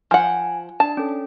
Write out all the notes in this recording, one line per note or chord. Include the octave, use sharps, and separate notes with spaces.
F3 F#5 G#5
D4 A5
C#4 A4